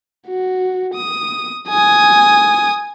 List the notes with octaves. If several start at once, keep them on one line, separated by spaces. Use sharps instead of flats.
F#4
D#6
G#5 D#6